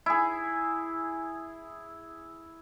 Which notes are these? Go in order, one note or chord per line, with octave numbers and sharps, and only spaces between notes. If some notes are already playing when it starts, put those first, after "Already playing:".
E4 G#4